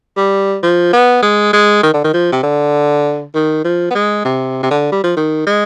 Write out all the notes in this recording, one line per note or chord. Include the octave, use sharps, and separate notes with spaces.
G3
F3
B3
G#3
G#3
D#3
D3
D#3
F3
C3
D3
D#3
F3
B3
G#3
C3
C3
D3
G3
F3
D#3
G#3